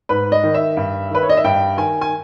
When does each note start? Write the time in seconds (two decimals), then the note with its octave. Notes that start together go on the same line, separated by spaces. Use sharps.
0.09 G#2 B4
0.32 D#5
0.44 D#3
0.54 E5
0.77 G2
1.11 D#3 B4
1.23 C#5
1.29 D#5
1.37 E5
1.44 G2 G5
1.78 D#3 G#5
2.01 G#5